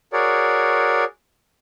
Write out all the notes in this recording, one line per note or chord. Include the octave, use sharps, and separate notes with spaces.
F#4 G#4 A#4 C#5 D5